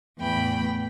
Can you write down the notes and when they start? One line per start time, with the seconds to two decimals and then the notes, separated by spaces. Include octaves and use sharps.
0.19 E2 A2 G5 B5